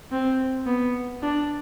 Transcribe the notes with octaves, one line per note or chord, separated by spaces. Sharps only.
C4
B3
D4